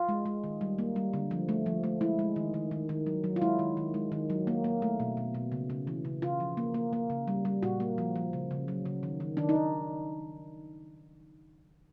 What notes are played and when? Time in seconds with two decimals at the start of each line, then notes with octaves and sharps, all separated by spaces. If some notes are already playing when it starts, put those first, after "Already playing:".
Already playing: F4
0.09 G#3
0.26 G#3
0.44 D#3
0.61 G3
0.78 A#3
0.96 G3
1.14 D3
1.31 F3
1.49 A3
1.66 F3
1.84 A3
2.01 G#3 E4
2.19 G#3
2.36 D#3
2.54 D#3
2.71 D#3
2.89 D#3
3.07 F#3
3.24 F#3
3.36 F4
3.42 G#3 E4
3.59 D#3
3.77 D#3
3.94 G#3
4.12 D#3
4.30 F#3
4.47 A#3
4.64 A#3
4.82 A3
5.00 B2
5.17 B2
5.35 B2
5.52 C#3
5.70 C#3
5.87 E3
6.05 C#3
6.22 C#3 F4
6.40 F3
6.57 A#3
6.74 A#3
6.93 A#3
7.10 C#3
7.28 G3
7.45 G3
7.63 A#2 F#4
7.80 A#3
7.98 F3
8.16 F3
8.33 C#3
8.51 C#3
8.68 F#3
8.86 C#3
9.03 D#3
9.20 D#3
9.37 D#3 D4
9.49 D#4
9.56 D#3